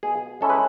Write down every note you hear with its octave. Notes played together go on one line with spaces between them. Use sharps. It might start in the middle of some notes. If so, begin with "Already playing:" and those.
B2 G#4
G#3 C#4 E4 A4
B4